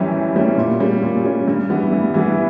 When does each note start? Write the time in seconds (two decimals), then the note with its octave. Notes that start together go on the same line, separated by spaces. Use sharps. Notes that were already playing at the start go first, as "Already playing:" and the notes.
Already playing: F#2 E3 G3 C#4 G4
0.12 F#2
0.35 E3 G3 C#4 G4
0.58 A#2
0.80 G3 C#4
1.03 A#2
1.25 G3 C#4
1.48 G2
1.70 E3 G3 B3
1.93 G2
2.14 E3 G3 B3